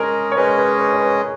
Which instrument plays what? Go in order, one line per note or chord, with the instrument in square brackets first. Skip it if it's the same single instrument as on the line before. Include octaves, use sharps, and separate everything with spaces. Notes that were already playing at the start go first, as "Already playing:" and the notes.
Already playing: [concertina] G#3 C#4 G#4 D#5 [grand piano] A#4
[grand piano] C#5
[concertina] G#3 C#4 G#4 D#5 [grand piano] B4
[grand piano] B4
B4
C#5
B4